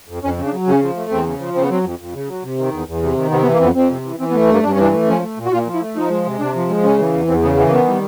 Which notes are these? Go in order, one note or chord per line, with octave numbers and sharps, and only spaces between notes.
F2
F2 C#4
C#3
D4
F#3
C#3 C#4
F3
A3
E2 C4
C#3
F3
C#3 C4
B3
F#3 C4
F2
F2
C#3
F#3
C3
D#3
E2
E2
C3
D#3
C3 B3
B3
E3
A#3
F2 B3 C4
F2 C4
C3
E3
E3 C4
B3
A3
G2 A#3
G2 D4
C#4
E3 D4
A3
F3 C#4
A3
A#2
F#4
A#2 F4
F3
E4
A3
F3 D#4
G#3
C3
C3 D4
F3
G#3
C#3 C#4
E3
E2
E2 C4
C#3 B3
E3 B3
A#3
D#3 B3
G3